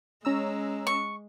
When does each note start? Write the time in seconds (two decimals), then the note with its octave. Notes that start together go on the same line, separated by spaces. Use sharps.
0.25 G#3 C#4 A#5 E6
0.87 C#6